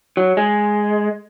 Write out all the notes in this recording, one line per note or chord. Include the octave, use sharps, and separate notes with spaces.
F#3
G#3